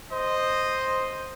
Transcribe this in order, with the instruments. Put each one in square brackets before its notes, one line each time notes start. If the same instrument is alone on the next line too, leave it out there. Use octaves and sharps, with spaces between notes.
[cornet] C5 [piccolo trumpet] D#5